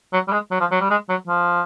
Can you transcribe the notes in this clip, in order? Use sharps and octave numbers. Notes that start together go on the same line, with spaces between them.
F#3
G3
G#3
F#3
F3
F#3
G3
G#3
F#3
F3